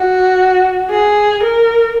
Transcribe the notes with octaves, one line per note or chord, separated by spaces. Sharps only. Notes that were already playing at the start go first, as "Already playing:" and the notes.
Already playing: F#4
G#4
A#4